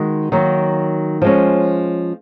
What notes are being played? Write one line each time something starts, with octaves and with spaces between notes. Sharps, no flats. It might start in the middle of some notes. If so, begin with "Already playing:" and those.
Already playing: D#3 G#3 F#4
D#3 F#3 A#3
F3 G#3 C#4